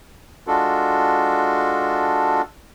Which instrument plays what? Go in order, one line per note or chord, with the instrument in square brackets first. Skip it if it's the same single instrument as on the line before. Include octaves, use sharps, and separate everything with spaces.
[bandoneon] G#3 D4 F4 F#4 A4